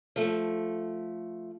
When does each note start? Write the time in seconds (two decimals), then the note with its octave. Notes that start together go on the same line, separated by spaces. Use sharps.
0.16 F3 A3